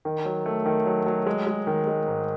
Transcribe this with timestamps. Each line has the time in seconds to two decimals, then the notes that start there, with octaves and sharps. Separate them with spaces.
0.05 D#3
0.25 F#3
0.46 A3
0.66 D#3
0.86 F#3
1.06 F#3
1.27 G#3
1.47 G#3
1.67 D#3
1.87 G#3
2.08 G#2